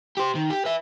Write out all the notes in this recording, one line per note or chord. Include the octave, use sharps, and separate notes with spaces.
G4 C5
D#3
G4
B4 E5